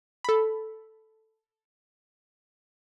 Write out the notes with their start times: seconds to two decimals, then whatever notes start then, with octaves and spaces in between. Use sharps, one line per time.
0.24 A4 B5